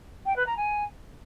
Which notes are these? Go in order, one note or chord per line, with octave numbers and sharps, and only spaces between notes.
G5
B4
A#5
G#5